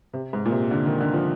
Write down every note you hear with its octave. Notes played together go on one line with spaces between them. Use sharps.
C3
G#2
A#2
C3
D3
D#3
D3
F3